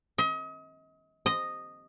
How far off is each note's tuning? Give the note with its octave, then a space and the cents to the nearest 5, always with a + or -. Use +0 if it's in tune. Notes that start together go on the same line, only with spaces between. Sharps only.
D#5 +35
D#5 -5